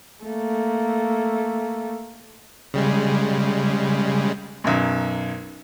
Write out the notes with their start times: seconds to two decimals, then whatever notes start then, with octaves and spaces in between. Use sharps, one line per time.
0.24 A3 A#3
2.74 C#3 G3 G#3
4.64 B1 F#2